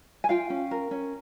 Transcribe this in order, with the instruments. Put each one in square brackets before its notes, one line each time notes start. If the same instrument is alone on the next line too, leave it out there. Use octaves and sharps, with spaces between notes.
[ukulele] G#5
F4 F5 G5
C#4
A#4
C#4